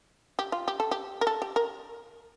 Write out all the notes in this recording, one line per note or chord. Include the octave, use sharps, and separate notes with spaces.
G4
F4
G4
A4
G4
A#4
A4
G4
A#4